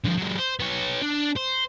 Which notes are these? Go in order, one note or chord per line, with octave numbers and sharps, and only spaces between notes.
D3 F3
F#3 G#3
C5
B3 C#5
D4
C5